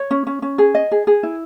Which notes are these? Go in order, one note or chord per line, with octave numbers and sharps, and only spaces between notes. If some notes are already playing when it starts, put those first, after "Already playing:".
Already playing: C#5
C#4
C#4
C#4
G#4
D#5
G#4
G#4
E4